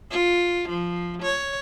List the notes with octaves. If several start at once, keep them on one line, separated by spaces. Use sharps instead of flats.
F4
F3
C#5